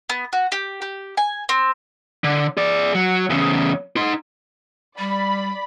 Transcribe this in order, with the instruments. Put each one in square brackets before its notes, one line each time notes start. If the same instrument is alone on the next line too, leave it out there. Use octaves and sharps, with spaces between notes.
[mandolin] B3
F#4
G4
G4
G#5
C4
[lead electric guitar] D3
G#4 D5
F#3
E2 C#3
D#4 C6
[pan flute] G3 [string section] D5 B5